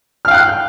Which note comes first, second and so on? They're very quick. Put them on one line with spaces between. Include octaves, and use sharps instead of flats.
F6 F5 G5 F#6